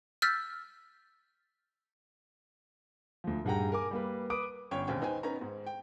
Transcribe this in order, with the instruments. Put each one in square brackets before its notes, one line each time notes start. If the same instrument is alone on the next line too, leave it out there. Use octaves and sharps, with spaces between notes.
[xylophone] E6 F6 G6 A6 B6
[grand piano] D2 F3
D#1 G2 G#4 F#5 G5 A#5
A#4 G#5 D6
G3 A#3 B4
B4 D6 D#6 D7
[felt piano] G1 C#4 C#5 G5
E1 D#2 C4 C#4 G5
D#4 B4 C5 G5 G#5
B3 C#4 D#4 A#5
G#2
G5